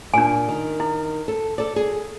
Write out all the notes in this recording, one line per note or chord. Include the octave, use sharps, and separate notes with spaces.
A#2 D4 G#5
D#3
E4
A4
A4 D5
G#4